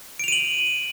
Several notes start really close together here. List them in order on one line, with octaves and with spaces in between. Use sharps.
D7 F7 D#7 F#7